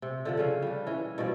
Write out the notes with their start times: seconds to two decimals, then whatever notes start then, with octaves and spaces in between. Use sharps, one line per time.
0.02 C3
0.25 D3 F3 F#5
0.37 C#3 F3 C#4 F5
0.62 G3 D4
0.87 E3 C#4
1.18 G2 B2 F3 D5